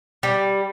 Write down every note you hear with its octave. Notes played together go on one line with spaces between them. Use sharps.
G3